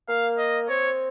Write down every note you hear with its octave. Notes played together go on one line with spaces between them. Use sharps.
A#3 F5
D#5
C4 C#5